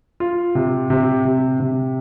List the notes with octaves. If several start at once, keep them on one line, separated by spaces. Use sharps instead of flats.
F4
C3
C3
C3
C3